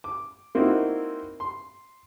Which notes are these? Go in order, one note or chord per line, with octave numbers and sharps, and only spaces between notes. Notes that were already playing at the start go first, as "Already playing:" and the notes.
D6
A#3 C4 D#4 E4 F#4
C6